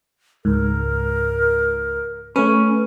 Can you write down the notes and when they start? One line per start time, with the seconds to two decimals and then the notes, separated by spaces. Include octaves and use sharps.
0.45 C#2 G#2 A#4
2.36 A3 C#4 B4